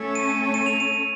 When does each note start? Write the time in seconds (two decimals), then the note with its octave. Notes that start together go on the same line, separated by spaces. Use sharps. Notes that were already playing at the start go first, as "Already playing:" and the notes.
Already playing: A3 C#4 A4 C#5
0.15 D#7
0.54 D#7
0.66 F7
0.80 D#7